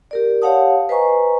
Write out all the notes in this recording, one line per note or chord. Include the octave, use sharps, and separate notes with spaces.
G4 A#4 D5
G4 C#5 F5 F#5 A5 D#6
B4 C5 D#5 G#5 A#5 C#6